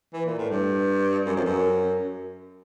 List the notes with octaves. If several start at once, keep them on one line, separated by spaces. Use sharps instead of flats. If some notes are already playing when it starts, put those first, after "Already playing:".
E3
A#2
A2
G2
F#2
F2
F#2